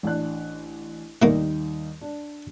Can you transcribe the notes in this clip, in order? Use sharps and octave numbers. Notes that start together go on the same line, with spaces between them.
A1 D4 F#6
D#2 G3 A3 A#3 D#4
D4